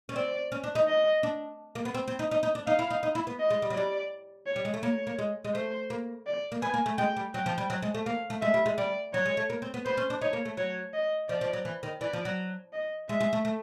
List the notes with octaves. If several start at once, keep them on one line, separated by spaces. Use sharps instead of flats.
C#4
C4 D5
C#4
D4
D#4
D#5
D4
A#3
B3
C4
C4
D#4
D#4
D#4
D4
D#4 F5
E4
D#4
D#4
E4
B3
D#5
G#3
G3
F#3
G3 D5
C#5
G3
G#3
A3
A#3 C#5
A#3
G#3
G#3
A3 C5
A#3
D5
A#3
B3 G#5
A#3
A3
G#3 G5
G3
F#3 G5
F3
G3
F#3
G#3
A3
A#3 F5
A3
G#3 E5
G3
G#3
G3 D5
F#3 C#5
G#3
A3
A#3
C4
B3
B3 C5
C#4
D4
D#4 C#5
A#3
A3
F#3 C#5
D#5
F3 D5
F3
F#3
E3
D#3
E3 D5
F3
F#3
D#5
G#3 E5
G#3
A3
A3